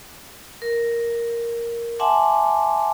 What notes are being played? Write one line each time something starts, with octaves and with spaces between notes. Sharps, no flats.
A#4
E5 F#5 G#5 A5 C6 D6